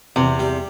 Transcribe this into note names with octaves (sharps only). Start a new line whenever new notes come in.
E2 C3
G3